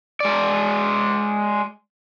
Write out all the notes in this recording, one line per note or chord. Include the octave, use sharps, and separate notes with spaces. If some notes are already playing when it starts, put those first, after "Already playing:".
G#3 D5